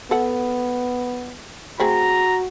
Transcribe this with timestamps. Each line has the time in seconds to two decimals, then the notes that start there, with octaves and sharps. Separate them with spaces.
0.11 B3 A4 F#5
1.80 A3 C4 F#4 G#4 A#5